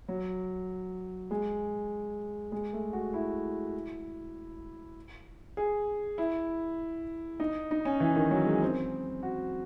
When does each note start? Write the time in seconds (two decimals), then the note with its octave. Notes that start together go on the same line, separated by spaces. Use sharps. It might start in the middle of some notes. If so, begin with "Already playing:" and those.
0.08 F#3
1.31 G#3
2.52 G#3
2.73 A3
2.93 F#4
3.13 E4
5.57 G#4
6.18 E4
7.40 D#4
7.71 D#4
7.85 C#4
8.00 E3
8.16 D#3
8.31 F#3
8.46 G#3
8.62 C4
9.23 F#4